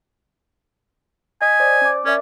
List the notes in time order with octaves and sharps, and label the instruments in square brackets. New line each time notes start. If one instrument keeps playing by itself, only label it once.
[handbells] D#5 D#6 B6 [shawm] G#5
[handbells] C5 D5
C#4 D6
[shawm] C#4 [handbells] A#4 D5 E5